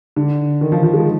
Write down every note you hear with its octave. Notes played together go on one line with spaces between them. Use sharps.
D3
D#3
F3
F3
G#3